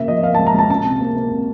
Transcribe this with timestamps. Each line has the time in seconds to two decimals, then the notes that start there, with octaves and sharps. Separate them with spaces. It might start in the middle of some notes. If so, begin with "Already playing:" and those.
Already playing: C#3 A#3 E5
0.08 F3 D#5
0.23 A#3 F5
0.34 A5
0.39 C#2
0.47 A#5
0.54 C#2 A5
0.70 C#4 A5
0.85 C3
1.01 A#3
1.16 A#3
1.31 C3